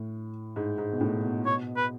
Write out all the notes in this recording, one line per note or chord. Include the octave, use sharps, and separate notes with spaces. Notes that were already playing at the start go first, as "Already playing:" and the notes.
Already playing: A2
G#2
G#2
B2
A2
B2
B2 C#5
B4